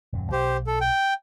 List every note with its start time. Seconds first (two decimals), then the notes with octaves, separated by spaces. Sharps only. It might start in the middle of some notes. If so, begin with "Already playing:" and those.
0.12 D#1 F#2 F#3
0.32 B1 G4 C5
0.67 A4
0.81 G5